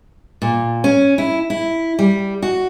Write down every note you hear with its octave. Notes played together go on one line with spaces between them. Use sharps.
A#2
C#4
E4
E4
G3
F#4